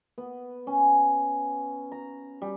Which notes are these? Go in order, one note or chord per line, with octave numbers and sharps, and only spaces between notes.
B3
C#4
A#5
G3